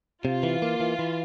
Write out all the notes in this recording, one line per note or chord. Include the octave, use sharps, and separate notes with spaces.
C3 F4
E3
A#3
E3
E3